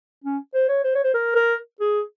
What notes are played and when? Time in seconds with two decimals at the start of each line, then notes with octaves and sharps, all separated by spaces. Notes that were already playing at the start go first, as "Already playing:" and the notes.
0.24 C#4
0.54 C5
0.69 C#5
0.84 C5
0.95 C#5
1.04 C5
1.14 A#4
1.35 A#4
1.80 G#4